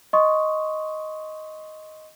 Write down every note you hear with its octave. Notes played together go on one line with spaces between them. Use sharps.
D#5 C6 C#6 D#6